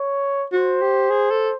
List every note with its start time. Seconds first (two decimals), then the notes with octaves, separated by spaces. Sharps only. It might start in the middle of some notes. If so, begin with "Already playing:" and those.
Already playing: C#5
0.52 F#4 C5
0.82 G4
1.11 G#4
1.31 A4